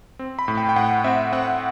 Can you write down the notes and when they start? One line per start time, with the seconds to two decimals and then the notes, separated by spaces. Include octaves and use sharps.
0.19 C4
0.39 B5
0.48 A2
0.57 G5
0.69 G5
0.76 A2 F#5
1.04 C4 E5
1.33 C4 F#5